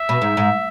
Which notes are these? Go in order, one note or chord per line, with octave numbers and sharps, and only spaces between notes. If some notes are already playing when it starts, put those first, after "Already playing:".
Already playing: E5
B2
G#2
G#2